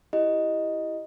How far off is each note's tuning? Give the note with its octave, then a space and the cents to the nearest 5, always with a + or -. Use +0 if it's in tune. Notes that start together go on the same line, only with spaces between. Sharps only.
E4 +0 G4 +0 D#5 +0